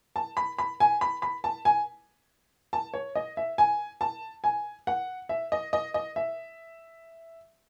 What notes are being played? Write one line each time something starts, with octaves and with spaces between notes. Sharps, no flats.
A5
B5
B5
G#5
B5
B5
A5
G#5
A5
C#5
D#5
E5
G#5
A5
G#5
F#5
E5
D#5
D#5
D#5
E5